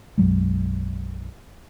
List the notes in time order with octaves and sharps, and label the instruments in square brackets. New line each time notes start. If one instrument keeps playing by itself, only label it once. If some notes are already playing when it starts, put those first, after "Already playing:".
[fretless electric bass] B1 F#2 F#3 G#3